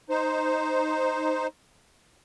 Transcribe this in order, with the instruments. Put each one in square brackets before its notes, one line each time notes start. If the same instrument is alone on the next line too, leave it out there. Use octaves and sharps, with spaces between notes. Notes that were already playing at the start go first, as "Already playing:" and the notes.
[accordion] D#4 C5